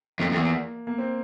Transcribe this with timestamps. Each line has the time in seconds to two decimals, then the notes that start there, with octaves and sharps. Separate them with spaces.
0.19 F2 A#3
0.32 F2
0.36 E2
0.87 A#3
0.98 C4